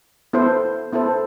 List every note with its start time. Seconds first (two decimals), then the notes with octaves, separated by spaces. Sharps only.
0.33 B3 E4 A4 C5
0.93 B3 E4 A4 C5